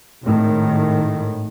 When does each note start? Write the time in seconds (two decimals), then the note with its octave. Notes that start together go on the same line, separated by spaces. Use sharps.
0.24 G#1 A2 D#3